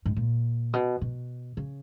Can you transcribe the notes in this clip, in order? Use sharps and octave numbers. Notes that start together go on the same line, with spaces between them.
G#2
A#2
B2
B2
C#3